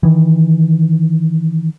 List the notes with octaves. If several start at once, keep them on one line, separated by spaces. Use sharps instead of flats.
D#3 E3